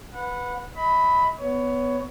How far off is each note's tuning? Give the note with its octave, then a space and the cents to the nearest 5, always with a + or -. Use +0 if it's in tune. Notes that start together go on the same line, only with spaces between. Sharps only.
B4 +0 F#5 -25
D#5 +45 B5 +5
B3 +10 C#5 +20